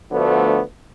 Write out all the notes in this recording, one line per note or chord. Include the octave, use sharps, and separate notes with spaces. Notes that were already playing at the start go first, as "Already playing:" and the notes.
D2 D3 F3 A3 B3